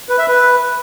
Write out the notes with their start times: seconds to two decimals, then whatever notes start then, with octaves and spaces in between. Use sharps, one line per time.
0.09 B4
0.18 E5
0.28 B4